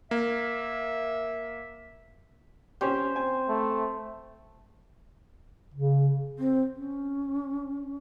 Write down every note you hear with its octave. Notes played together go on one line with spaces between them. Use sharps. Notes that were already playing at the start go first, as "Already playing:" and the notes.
A#3 E5
C#4 G4 C5
C4 G#5
A3
C#3
C4
C#4